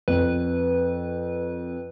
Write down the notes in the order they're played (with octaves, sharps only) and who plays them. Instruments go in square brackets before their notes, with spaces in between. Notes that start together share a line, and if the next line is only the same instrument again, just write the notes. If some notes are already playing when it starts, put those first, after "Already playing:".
[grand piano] F2 [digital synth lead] B4